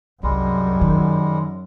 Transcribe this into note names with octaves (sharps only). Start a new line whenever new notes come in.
C2 F#2 G3 G#3
D#3